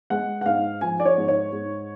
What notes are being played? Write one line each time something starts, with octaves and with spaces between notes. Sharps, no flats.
G#3 F#5
F#5
G#2 F5
F3 G#5
D5
C#5
G#2
C#5
G#2